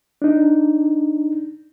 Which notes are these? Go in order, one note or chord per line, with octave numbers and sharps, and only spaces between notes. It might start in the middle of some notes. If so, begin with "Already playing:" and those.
D4 D#4